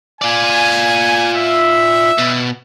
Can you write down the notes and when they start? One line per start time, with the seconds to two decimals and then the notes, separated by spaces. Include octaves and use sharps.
0.22 F4 D5 G#5
1.34 E5
2.18 B2